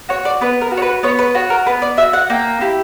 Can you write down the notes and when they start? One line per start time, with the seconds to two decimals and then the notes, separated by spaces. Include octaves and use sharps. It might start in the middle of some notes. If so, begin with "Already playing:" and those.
0.09 F#4 C#5
0.25 D5
0.41 B3 B4
0.61 A#4
0.72 F#4
0.77 C#5
0.82 B4
1.03 B3 C#5
1.19 B4
1.35 F#4 C#5
1.50 A#4
1.66 B3 B4
1.82 D5
1.97 F#4 E5
2.13 F#5
2.30 A#3 G5
2.61 E4 G4